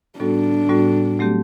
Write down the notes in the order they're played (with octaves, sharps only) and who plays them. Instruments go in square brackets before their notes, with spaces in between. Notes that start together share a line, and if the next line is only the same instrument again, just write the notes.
[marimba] A2 G3 B3 F#4 A4 [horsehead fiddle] D4
[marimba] A2 G3 B3 F#4 A4
F#3 A3 C4 G4